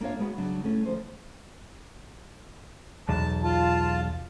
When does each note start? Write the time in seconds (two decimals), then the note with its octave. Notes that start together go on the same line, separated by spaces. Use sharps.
0.01 A#3 D4 F4 C#5 F5
0.19 G#3 B3 F#4
0.38 C#3 F#3 D4
0.64 A3 C#4 E4
0.85 D2 F3 C5
3.09 B1 E2 A5
3.44 F4 A5